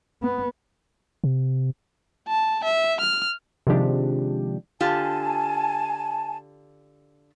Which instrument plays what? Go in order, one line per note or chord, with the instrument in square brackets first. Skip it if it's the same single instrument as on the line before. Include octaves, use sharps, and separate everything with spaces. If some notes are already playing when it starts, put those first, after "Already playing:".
[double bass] B3
[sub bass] C3
[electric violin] A5
E5
F6
[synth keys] C3 D#3 F3 G#3 D4 G4
[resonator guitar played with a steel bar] D3 F4 G4 [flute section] G#5 A5